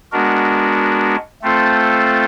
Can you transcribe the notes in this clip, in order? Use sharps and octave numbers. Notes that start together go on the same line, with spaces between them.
G#3 B3 D4 F#4 A#4
A3 C4 F4 A4 C5